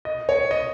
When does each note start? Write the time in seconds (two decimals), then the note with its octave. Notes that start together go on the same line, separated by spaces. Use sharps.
0.05 D#5
0.29 C#5
0.51 D#5